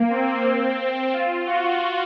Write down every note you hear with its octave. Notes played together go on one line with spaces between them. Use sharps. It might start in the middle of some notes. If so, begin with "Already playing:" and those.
Already playing: A#3
C4
F4
F#4